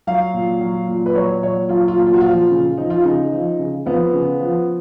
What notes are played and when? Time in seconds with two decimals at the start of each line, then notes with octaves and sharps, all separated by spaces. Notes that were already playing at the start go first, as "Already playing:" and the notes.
0.07 F#3 F5
0.34 A#2
0.61 F#3
0.88 A#2
1.06 B4
1.15 F#3 C#5
1.43 A#2 C#5
1.69 F#3 F4
1.88 F4
1.97 A#2
2.06 F4
2.13 F#4
2.21 F3 F4
2.51 C#3
2.78 F3 D#4
2.90 F4
3.04 C#3 D#4
3.32 F3
3.59 C#3
3.86 F3 B3
4.14 C#3
4.40 F3